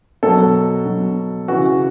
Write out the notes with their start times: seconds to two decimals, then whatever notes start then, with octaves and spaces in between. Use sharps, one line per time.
0.23 B2 F#3 A4
0.86 B2 F#3
1.48 C#3 E3 F#4